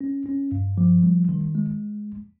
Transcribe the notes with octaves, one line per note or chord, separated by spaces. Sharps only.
C#4
C#4
G2
F3
G3
D#3
G#3